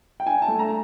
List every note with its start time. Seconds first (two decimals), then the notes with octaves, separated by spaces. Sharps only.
0.20 G5
0.26 D4 G#5
0.42 A5
0.48 A3
0.59 A#5